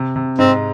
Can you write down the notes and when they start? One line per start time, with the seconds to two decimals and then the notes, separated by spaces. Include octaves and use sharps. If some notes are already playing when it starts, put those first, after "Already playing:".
Already playing: C3
0.16 C3
0.39 G#2 C4